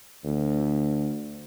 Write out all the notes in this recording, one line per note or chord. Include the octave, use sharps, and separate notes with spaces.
D2